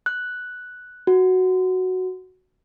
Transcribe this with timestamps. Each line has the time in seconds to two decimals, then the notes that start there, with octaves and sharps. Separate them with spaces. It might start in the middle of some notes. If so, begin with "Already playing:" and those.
0.06 F#6
1.07 F#4